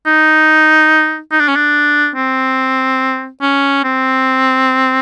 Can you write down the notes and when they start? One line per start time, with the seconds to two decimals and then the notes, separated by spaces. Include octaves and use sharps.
0.06 D#4
1.32 D#4
1.40 D4
1.48 C#4
1.56 D4
2.16 C4
3.42 C#4
3.84 C4